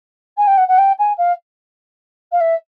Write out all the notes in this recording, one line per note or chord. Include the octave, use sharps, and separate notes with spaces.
G#5
G5
F#5
F#5
G5
G#5
F5
F5
E5